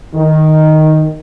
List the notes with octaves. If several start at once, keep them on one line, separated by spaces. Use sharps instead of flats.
D#3